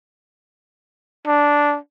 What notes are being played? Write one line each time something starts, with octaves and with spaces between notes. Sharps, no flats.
D4